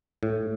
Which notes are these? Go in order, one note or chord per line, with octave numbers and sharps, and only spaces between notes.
A2